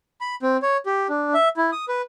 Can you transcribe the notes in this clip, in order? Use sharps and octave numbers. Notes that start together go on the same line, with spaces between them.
B5
C4
C#5
G4
D4
E5
E4
D#6
B4